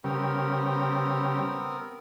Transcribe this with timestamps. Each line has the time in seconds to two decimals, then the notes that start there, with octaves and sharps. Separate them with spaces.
0.04 C#3 G3 B3 C4 A#4